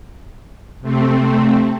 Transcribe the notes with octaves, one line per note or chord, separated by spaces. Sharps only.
C3 A3 C4